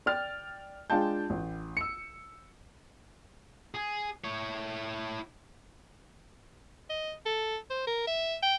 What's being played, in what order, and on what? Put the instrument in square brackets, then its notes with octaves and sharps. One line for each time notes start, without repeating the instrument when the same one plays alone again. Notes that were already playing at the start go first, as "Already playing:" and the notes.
[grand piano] D5 G5 F6 A6
G#3 D4 F4 G5 A5 G6
A1
E6 C#7
[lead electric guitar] G#4
E4 C#5
[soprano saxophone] D#5
A4
C5
A#4
E5
G5